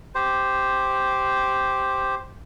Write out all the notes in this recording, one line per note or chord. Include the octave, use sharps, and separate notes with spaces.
G4 C5